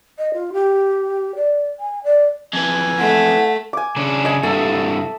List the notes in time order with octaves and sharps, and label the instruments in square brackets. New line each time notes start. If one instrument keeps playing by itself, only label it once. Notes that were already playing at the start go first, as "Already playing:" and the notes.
[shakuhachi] D#5
F4
G4
D5
G#5
D5
[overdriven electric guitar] F2 E3 [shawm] G#5
[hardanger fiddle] A3 [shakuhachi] F#5
[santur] G#5 D6
[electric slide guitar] C#3 C#4 D4
[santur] D#5 G#5
[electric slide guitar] G2 C3 F#4 [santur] A4 E5